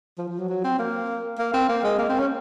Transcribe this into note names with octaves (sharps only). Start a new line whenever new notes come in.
F3
F3
F#3
F#3
C4
A#3
A#3
C4
A#3
G#3
A#3
C4
C#4